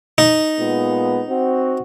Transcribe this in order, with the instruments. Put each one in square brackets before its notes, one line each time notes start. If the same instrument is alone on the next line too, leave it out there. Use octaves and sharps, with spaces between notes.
[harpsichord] D#4
[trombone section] A#2 G#3 B3
C4 F#4